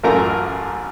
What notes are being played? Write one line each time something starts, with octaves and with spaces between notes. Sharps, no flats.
A1 F#2 A3 F4 A#4 A#5